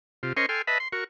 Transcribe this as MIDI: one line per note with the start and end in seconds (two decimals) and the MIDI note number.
0.23 0.33 48
0.23 0.33 65
0.37 0.46 61
0.37 0.46 70
0.37 0.46 72
0.37 0.46 75
0.37 0.46 84
0.37 0.46 85
0.49 0.62 69
0.49 0.62 79
0.49 0.62 80
0.49 0.62 84
0.49 0.62 89
0.67 0.78 71
0.67 0.78 75
0.67 0.78 76
0.67 0.78 81
0.67 0.78 83
0.80 0.88 84
0.92 1.04 66
0.92 1.04 70
0.92 1.04 85